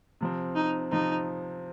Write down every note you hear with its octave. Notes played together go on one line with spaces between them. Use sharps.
C3 F3 C4
D#4
C3 F3 C4 D#4